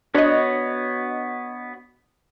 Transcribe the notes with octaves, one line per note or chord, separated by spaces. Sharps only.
B3 D4 F#4 C#5 D#5